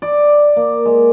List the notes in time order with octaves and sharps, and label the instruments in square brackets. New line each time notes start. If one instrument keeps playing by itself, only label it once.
[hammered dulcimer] D5
A#3
G#3